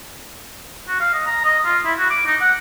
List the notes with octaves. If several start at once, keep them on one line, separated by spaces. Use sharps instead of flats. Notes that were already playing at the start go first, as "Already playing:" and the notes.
F#4
F5
D#5
A#5
D#5
F4
E4
F#4
D6
D#4
F#5